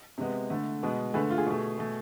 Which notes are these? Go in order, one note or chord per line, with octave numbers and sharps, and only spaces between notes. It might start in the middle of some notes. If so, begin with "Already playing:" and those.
C3 G#3 B3
D3 A3
B2 G#3 B3
D3 A3 G#4 B4
F4
G#4
B2 A3
B2 A3